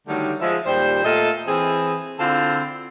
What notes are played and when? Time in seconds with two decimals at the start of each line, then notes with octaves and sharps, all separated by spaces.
0.08 D3 D#3 F#3 G3 A3
0.41 F3 G#3 E5
0.66 D#2 A#2 G3 C5
1.05 A#2 A3 F4 A4 D#5
1.47 E3 C4 G#4
2.19 D3 C4 E4 F4 A4 C5